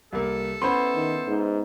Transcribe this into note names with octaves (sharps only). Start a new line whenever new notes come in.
C2 A#3 A4
B3 C#4 E4 C5 C6
D#3
G#2